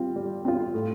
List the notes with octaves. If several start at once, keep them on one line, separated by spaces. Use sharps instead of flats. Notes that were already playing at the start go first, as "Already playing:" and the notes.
Already playing: G3 C4 F4
G3
C4 F4
A2